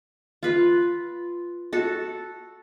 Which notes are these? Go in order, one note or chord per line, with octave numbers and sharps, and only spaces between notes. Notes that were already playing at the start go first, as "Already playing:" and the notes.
F4 B4
F#4 A4